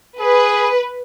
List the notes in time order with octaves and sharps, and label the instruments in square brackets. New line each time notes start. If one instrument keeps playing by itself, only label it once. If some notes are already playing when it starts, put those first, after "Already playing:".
[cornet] G#4 [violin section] B4